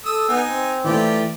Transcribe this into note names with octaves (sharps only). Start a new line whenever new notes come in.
A4 D#6 E6
B3 D#4 G#5
C4
E3 A3 F4 G4 D5